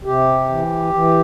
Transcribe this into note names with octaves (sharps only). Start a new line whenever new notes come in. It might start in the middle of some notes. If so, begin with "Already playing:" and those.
C3 G4
E3
E3